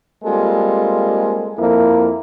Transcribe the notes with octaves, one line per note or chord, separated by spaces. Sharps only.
G3 G#3 A#3 C4 F4 A4
F2 A#3 E4